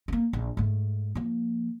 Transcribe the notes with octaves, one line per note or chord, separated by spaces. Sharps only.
A#3 C4
A#1
G#2 A3
F3 A#3